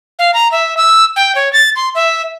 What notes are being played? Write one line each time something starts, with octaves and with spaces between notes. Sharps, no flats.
F5
A#5
E5
E6
G5
C#5
A6
C6
E5